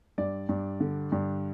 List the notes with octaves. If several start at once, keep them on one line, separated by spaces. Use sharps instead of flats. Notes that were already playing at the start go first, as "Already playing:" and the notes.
G2 D5
G2
D3
G2